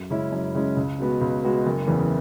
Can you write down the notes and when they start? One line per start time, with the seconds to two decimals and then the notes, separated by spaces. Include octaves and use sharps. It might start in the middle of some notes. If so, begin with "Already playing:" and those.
Already playing: F#2
0.10 C#3 G#3 C#4 E4
0.32 F#2
0.54 C#3 G#3 C#4 E4
0.77 C#2
0.98 B2 G#3 B3 F#4
1.21 C#2
1.43 B2 G#3 B3 F#4
1.66 F#1
1.87 E2 C#3 E3